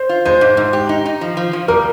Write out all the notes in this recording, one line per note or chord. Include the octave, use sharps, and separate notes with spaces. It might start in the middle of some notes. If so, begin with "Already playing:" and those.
Already playing: C5
F4
G#3 C5
G#2
G#2
G4
D#4
D#4
F3
F3
F3
G3 A#4